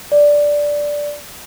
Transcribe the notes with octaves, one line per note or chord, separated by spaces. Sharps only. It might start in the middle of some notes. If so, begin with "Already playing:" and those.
D5